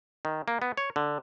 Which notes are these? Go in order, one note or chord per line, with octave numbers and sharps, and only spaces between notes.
D#3
A#3
B3
C#5
D3